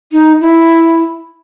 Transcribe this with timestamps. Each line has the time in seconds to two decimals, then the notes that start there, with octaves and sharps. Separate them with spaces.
0.12 D#4
0.41 E4